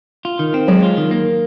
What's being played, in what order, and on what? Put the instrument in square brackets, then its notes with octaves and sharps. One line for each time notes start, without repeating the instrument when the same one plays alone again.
[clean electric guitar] F4
D#3
C4
[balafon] F#3 [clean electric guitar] G#3
[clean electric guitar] F4
D#3
A#3